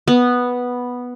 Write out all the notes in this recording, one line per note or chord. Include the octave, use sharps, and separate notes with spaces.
B3